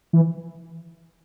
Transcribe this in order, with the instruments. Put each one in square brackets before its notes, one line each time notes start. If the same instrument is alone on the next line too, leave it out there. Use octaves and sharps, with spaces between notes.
[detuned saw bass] E3